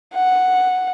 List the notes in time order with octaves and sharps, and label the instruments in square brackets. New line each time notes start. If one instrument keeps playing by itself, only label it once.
[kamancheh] F#5